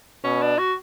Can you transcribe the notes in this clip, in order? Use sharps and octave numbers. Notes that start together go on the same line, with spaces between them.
B2 C#4
D4
F#4